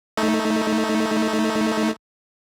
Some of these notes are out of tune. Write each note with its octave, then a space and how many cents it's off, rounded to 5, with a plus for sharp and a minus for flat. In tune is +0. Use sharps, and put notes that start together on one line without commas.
A3 +0 D#4 +20